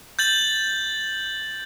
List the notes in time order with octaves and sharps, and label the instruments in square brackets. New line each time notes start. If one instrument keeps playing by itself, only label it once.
[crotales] G6 A6 F#7